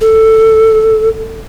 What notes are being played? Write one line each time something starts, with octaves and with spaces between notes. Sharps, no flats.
A4